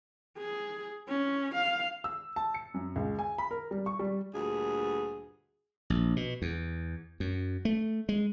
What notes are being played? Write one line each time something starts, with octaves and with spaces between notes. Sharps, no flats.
G#4
C#4
F5
E6
A5
C#7
F#2
C#2
G#5
B5
A#4
G3
C#6
G3
D2 G2 A#2 G#4
A#1
B2
E2
F#2
A3
G#3